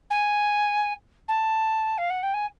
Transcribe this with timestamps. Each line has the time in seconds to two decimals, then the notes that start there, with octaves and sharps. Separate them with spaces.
0.10 G#5
1.28 A5
1.98 F5
2.10 F#5
2.23 G5
2.34 G#5